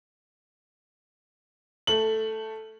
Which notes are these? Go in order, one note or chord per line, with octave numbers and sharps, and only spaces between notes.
A3 F#7